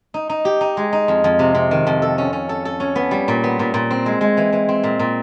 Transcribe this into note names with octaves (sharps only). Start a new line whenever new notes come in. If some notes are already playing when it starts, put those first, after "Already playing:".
D#4
D#4
G4
D#4
G#3
D#4
F2
F2
C3
C3
D#3
F2
A4
C#4
C#4
A4
A4
C#4
B3
G3
A#2
B3
A#2
A#2
C4
G#3
G#3
E3
E3
C4
A#2
A#2